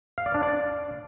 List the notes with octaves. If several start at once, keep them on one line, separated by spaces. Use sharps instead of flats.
F5
D5
D4
D5